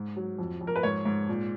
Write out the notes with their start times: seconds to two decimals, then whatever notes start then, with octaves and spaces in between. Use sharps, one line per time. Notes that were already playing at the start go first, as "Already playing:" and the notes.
Already playing: G#2
0.16 F#3
0.39 F2
0.61 F2
0.67 A#4
0.76 B4
0.83 G#2 C#5
1.05 G#2
1.29 A#2